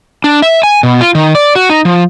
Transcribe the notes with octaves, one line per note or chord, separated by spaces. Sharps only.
D4
E5
G#5
B2
F4
D#3
D5
F#4
D#4
F3